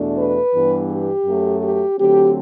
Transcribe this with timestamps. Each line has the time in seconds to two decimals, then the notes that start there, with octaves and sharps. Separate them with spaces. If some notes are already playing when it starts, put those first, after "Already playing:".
Already playing: E2 B2 A3 D4
0.17 B4
0.54 G2 E3 G3 B3
0.90 G4
1.25 F#2 F#3 A3
1.63 G4
1.98 D3 F#3 A3 C4 G4